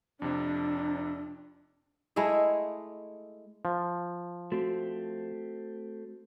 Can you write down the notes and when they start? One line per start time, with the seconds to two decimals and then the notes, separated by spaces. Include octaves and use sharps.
0.22 F2 C3 D4
2.16 G#3 A3 E4 G#4
3.65 F3
4.52 A3 C4 F#4